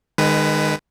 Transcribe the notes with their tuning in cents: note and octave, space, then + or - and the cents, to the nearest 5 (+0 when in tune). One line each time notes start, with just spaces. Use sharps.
D#3 -25 G#3 -5 B4 +10